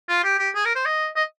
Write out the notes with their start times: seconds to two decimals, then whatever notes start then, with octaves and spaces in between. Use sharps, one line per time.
0.09 F4
0.24 G4
0.39 G4
0.55 G#4
0.65 A#4
0.75 C5
0.85 D#5
1.16 D#5